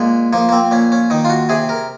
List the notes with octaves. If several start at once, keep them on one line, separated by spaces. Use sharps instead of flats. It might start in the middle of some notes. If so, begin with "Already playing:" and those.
Already playing: A#2 G#3
F3 A#3
A#3
C4
A#2 C#4
C#4
D#3 D#4
F4
F#4
C3 G#4
A#4